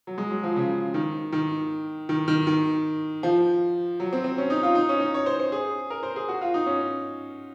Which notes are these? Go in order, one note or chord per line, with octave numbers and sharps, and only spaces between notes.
F#3
G#3
F#3
F3
C#3
D#3
D#3
D#3
D#3
D#3
F3
F#3
C4
C4
C#4
D#4
F4
D#4
C#4
D#4
C#5
C5
C5
G#4
A#4
C5
G#4
F#4
F4
D#4
C#4